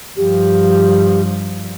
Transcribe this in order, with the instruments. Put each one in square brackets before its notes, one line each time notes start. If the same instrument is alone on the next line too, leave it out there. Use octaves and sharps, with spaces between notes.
[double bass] G2 F3 [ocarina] G4